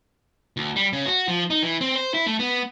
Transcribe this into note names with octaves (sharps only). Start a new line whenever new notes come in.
D2
G3
C#3
F#4
F3
D#4
E3
C4
C5
E4
A3
B3